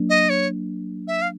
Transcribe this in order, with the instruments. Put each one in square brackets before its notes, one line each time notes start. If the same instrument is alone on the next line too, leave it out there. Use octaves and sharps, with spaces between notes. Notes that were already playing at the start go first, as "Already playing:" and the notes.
Already playing: [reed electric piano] F#3 A#3 D4
[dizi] D#5
C#5
E5
F5